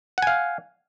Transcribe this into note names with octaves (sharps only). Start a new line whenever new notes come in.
F5 F#5 G#5